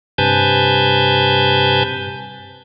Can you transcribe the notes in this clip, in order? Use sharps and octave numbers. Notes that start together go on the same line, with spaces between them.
G2 C3 B4 G#5 A5 G6